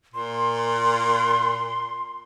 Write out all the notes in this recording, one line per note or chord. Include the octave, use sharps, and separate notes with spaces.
A#2 C6